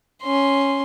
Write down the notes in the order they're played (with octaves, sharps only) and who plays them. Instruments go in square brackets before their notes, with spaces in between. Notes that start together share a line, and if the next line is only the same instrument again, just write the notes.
[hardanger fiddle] C#4 C6